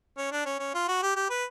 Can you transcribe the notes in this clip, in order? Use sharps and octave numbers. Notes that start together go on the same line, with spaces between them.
C#4
D4
C#4
C#4
F4
F#4
G4
G4
B4